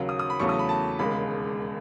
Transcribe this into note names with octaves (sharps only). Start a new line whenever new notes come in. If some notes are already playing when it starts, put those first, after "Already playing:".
Already playing: D#2 C#3 F#3
D#6
D#6
B5
E2 C#3 F#3 A3 C#6
D#6
B5
A5
E1 D#2 C#3 G#3 B5